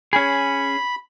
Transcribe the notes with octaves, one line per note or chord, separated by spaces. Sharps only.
C#4 G#4 B5